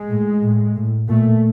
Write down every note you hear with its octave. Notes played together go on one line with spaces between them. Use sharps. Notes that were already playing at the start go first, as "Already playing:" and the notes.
Already playing: G#3
A2
A2
A2
A#2 A3